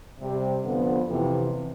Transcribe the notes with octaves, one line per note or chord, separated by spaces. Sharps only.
C3 G3 C4 G4
F2 D3 F3 B3
F2 C3 E3